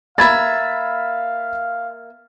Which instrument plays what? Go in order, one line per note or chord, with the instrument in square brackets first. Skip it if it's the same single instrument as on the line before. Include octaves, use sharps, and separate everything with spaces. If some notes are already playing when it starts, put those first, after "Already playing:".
[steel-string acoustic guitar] A#3 E5 [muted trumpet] F5 [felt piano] B5 G#6 A6